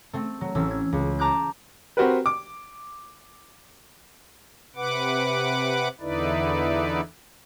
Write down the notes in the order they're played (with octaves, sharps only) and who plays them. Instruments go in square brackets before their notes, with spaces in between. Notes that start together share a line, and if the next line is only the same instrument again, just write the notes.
[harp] A3 C4
F#3
A1 C4 C#4 E6
G#6
C#2
A5 A#5 D6 F#6 G6
[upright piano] C4 F#4 G4 A#4 B4
D6
[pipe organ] C3 B4 F#5 D6
E2 D3 D#4 E4 B4 D5